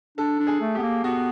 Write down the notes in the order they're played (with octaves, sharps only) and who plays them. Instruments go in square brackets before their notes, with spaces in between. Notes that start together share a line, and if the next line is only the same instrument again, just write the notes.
[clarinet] D4 [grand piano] A4
[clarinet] D4
[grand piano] G#4
[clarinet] A3
[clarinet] B3 [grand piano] G4
[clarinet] A#3
[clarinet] B3 [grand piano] F#4